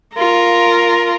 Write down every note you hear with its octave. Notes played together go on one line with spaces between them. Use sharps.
F4 A#4